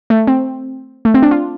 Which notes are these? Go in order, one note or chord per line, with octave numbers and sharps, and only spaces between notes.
A3
C4
A3
C4
D4
F4